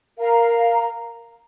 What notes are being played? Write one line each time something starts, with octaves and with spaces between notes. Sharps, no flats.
A#4 F5 A#5